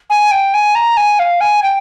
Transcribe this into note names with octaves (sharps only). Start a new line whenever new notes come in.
G#5
G5
G#5
A#5
G#5
F5
G#5
G5